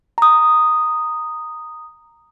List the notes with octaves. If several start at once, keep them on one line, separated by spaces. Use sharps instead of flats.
A#5 D#6